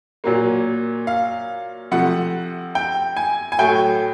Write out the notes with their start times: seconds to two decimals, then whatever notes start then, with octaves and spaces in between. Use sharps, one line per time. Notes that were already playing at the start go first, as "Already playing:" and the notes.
0.24 A#2 F#3 A#3
1.07 F5
1.91 C3 F3 A3 F#5
2.75 G5
3.17 G#5
3.52 G#5
3.59 A2 F#3 A3 G5